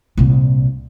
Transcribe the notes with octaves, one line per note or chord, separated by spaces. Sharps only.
C2 A#2